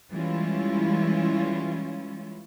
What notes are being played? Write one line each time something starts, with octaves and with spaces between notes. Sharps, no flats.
E3 G3 G#3 C#4 E4 F4